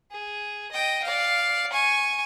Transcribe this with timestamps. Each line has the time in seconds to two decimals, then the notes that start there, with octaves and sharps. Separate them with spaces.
0.11 G#4
0.72 D#5 G5
1.04 D5 F5
1.72 G#5 C#6